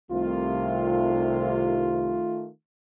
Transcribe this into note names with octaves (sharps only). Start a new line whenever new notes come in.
C2 C3 D#3 A3 F4